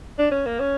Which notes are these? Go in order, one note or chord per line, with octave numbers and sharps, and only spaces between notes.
D4
C#4
A#3
C#4